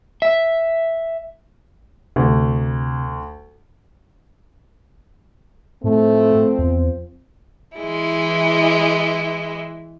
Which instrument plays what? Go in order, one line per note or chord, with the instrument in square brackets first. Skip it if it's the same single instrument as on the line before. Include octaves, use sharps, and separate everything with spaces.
[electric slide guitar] E5
[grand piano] D2 [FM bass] C3
[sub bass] A2 [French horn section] F3 C4 [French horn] A3
[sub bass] E2
[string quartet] E3 G#3 E4